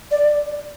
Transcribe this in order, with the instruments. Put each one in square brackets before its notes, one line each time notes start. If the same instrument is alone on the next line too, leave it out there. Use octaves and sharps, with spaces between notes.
[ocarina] D5